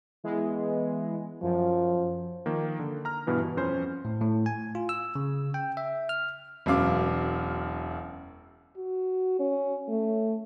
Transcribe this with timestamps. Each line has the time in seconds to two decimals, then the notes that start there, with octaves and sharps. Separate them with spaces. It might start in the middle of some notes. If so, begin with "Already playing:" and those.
0.24 E3 G#3 B3
1.43 F#2 F3
2.46 D#3 F3 A#3
2.79 D3
3.05 A#5 F6
3.27 G2 B2 E3 B3
3.43 B2
3.57 F2 C#4 C5
4.05 A2
4.21 A2
4.46 G#5
4.75 F4
4.89 E6
5.15 C#3
5.54 G5
5.77 E5
6.09 F6
6.66 E1 F#2 F5 D6
8.77 F#4
9.40 C#4
9.89 A3